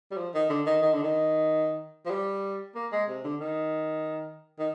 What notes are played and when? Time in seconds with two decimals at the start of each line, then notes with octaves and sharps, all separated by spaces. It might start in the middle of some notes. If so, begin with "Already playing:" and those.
0.11 G3
0.17 F3
0.34 D#3
0.50 D3
0.66 D#3
0.82 D#3
0.93 D3
1.03 D#3
2.05 F3
2.10 G3
2.75 A#3
2.92 G#3
3.08 C3
3.24 D3
3.40 D#3
4.59 D#3